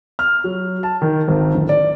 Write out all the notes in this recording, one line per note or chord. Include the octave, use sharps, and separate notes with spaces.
F6
F#3
A5
D#3
G#1
D1
D5